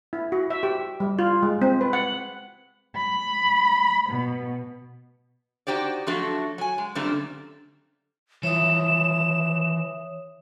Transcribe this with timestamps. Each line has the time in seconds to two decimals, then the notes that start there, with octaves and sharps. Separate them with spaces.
0.13 E4
0.32 F#4
0.50 E5
0.63 G4
1.00 G3
1.19 F4
1.43 G#3
1.62 C4
1.81 B4
1.93 F#5
2.96 B5
4.09 B2
5.67 D#4 F#4 G4 C5 D5
6.07 F3 F#3 A3 D4 F#4
6.58 F#3 G#5
6.78 G#3
6.95 F#2 A#2 D3 G3 A3 C4
8.43 E3 F3 C#5 E5 D#6 E7